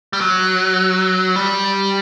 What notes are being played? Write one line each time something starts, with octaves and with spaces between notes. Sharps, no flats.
G3
F#3
G3